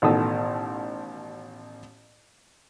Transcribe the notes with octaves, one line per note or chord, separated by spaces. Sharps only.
A1 B2 D#3 A4 D#6 E6